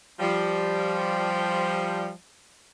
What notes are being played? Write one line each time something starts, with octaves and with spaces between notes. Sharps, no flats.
F3 G3